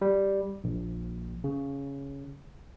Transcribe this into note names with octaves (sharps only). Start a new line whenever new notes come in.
G3
A#1
C#3